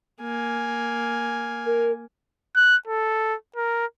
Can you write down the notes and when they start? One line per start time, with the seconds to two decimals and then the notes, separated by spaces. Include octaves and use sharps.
0.21 A#3 G#5
1.65 A#4
2.55 F#6
2.87 A4
3.56 A#4